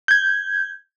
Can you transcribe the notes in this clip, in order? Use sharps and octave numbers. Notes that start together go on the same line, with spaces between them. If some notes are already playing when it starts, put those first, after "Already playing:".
G6 G#6